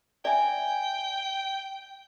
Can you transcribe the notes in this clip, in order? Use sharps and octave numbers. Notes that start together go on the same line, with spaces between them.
D5 E5 G5 G#5